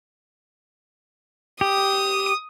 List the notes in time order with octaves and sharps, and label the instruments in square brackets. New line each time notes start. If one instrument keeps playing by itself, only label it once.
[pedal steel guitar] G4 [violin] D#6